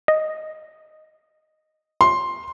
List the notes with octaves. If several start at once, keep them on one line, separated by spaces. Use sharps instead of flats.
D#5
C6